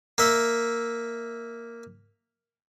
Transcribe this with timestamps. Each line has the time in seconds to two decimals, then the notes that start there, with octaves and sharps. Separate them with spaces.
0.18 A#3 E5